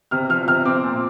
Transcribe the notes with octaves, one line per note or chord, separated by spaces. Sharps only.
C3 F6
F3 F6
C3 F6
C4 D6
A#2